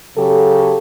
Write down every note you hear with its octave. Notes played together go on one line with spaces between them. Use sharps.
C#3 F#3 F#4 G4 A4